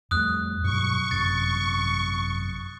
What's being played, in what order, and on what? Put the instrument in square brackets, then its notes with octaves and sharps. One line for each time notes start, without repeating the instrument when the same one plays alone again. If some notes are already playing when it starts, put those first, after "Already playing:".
[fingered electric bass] F2 G3 A3 [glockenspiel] D#6 F#6
[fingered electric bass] G2 B2 F#3 [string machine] C#6
[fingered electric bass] G#1 F#2 C3 [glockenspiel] A6